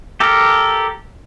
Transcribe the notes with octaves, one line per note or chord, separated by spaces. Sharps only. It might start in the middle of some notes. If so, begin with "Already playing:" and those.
G4 A4 A#4